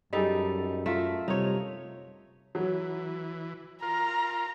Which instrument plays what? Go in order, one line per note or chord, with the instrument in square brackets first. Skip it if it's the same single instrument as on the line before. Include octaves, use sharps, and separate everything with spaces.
[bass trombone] F#2 [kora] G3 D#4 A4 [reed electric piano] G#4 D#5
[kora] A3 A#4 E5 [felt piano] F4
[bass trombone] C3 [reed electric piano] G3 [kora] D#4 C#5
[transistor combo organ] E3 [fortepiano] F#3
[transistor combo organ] F4 A#4 [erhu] A#5